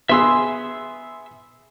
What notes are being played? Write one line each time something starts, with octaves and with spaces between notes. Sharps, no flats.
B3 G#4 E5 C6 E6